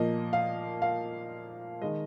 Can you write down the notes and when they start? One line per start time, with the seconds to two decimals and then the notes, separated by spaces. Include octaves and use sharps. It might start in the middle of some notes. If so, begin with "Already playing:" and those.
Already playing: A#2 F3 A#3 D#5
0.33 F5
0.82 F5
1.82 D#3 G#3 D#5